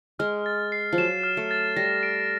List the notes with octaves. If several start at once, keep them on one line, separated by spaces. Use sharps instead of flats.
G#3 F6
A6
C7
F3
F#3 E7
F6
A3
A6
G3 A#6
D7